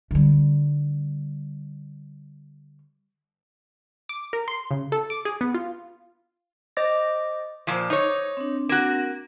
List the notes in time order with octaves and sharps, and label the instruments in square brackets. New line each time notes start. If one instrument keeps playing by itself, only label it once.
[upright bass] D3 G3
[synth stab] D6
A#4
C6
C#3
A4
D6
G#4
B3
F4
[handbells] C5 D#5 D6 A6 A#6
[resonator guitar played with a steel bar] A#2 F3 [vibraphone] C5 D6
[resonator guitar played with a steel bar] D#4 C#5
[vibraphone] C4 D4
[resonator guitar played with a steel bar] A#3 F#4